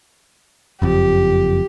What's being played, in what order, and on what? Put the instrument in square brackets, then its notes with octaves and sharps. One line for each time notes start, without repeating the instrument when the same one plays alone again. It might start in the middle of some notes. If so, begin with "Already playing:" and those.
[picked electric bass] F#1 F2 [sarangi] G4